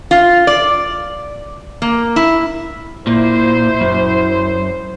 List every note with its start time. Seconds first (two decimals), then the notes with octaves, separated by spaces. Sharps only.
0.11 F4
0.47 D5
1.82 A#3
2.16 E4
3.07 A#2 E4 C5
3.81 F#2